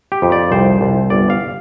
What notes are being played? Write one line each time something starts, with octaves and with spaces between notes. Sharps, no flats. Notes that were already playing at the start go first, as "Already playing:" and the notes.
G4
F2
D5
C2 C5
C2
G1 D5
F5